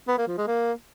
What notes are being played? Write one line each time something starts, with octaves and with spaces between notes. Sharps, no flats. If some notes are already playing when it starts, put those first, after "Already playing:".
B3
A#3
F3
G#3
A#3